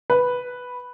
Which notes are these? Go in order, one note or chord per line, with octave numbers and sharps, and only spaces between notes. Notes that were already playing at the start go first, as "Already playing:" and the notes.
B4